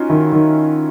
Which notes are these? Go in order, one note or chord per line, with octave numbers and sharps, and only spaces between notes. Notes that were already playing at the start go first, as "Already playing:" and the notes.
Already playing: C#4 D#4 F4 F#4
D#3 E4
D#3